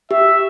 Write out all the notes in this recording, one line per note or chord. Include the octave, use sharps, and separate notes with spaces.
G4 E5